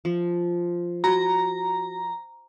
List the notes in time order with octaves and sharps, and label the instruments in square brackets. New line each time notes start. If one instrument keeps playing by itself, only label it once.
[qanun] F3
[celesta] F#4 [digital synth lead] A#5